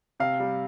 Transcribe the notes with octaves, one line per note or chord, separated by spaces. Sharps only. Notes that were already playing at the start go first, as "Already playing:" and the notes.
C3 F5
G3